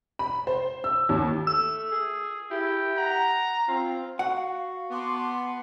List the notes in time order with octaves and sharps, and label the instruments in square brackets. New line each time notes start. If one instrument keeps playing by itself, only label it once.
[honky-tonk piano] B5
C5
E6
D#2
[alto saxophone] A3 [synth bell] E6
[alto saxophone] G#4
[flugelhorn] E4 [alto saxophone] G4
[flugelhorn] F#5 [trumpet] A#5
[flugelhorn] C4 [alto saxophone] F4
[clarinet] F#4 [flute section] F5 [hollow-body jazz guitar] F#5
[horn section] B3 [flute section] A5 C6 D6